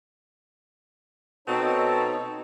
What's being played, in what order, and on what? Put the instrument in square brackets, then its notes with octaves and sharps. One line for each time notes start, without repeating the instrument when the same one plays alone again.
[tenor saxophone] B2 [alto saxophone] C4 [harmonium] D#4 C#5 [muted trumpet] A4